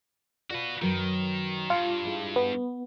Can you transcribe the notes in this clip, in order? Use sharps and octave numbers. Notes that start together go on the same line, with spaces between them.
F4 F#4 B4 D5
F#2 D#3 F#3 B4
G2 F4
G#3 E4
B3